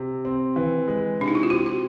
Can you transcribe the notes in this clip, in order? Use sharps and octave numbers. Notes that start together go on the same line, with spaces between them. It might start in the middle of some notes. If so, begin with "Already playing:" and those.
Already playing: C3
C4
E3
G#3
C3 D4
D#4
E4
F4
C4 F#4
F#4